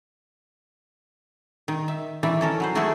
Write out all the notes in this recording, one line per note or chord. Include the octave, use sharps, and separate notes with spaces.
D#3
E5
D#3 E3 D5 E5
C#4 A4 A#4
F#3 B4 C5
D#3 A3 B3 E4 F#4 G#4